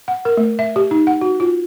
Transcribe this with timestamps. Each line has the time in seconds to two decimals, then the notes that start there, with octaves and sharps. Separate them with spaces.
0.08 F#5
0.25 A#4
0.37 A3
0.59 E5
0.76 G4
0.91 D#4
1.07 F#5
1.21 F#4
1.40 F4